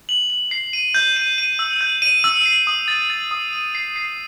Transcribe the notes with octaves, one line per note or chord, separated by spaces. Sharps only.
F#7
F#7
C7
D#7
G6
D#7
D#7
E6
G6
D#7
E6
C7
D#6
A6
A6
D#6
D#7
C7
C7